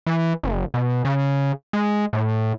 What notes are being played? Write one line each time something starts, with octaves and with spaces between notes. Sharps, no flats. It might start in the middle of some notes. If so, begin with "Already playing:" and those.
E3
F#1
B2
C#3
G#3
A2